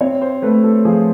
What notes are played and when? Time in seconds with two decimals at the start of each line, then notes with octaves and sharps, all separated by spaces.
0.01 C4 C#5
0.21 C5
0.42 A3 B4
0.64 A4
0.85 F3 G#4